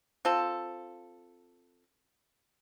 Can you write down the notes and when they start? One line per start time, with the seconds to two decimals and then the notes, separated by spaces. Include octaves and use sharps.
0.25 C4 F4 A4